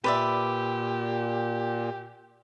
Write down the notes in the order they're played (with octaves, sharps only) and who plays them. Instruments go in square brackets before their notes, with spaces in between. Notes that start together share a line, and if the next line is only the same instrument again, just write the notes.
[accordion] A#2 [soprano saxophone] G4 [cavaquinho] B4 D5 E5